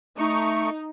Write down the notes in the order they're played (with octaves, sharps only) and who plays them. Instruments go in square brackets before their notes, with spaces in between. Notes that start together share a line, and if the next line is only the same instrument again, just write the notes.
[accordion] A3 C#6 [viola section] D#4